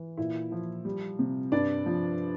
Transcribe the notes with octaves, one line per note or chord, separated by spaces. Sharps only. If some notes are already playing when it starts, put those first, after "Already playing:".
Already playing: E3
A#2 E4
F3
G3
C3
G2 D4 D5
F3